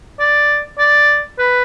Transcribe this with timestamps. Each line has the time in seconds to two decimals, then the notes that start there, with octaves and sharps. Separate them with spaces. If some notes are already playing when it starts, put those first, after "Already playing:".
0.20 D5
0.79 D5
1.39 B4